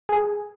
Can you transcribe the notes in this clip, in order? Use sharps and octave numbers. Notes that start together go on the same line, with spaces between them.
G#4